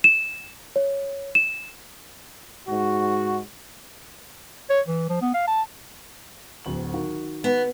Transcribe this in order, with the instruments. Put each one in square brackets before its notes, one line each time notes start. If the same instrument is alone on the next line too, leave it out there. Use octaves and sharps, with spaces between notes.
[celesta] E7
C#5
E7
[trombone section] G#2 F#4
[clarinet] C#5
E3
F3
B3
F5
A5
[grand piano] D1 D2 F#7
D#3 F#4
[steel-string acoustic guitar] B3